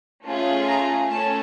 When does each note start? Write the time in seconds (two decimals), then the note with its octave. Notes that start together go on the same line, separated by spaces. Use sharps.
0.25 A3 C#4 F4 G#4
0.67 A#5
1.10 A3 C#4 A5